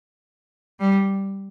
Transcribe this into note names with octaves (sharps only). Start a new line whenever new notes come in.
G3